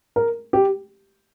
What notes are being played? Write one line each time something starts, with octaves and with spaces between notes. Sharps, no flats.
A#4
G4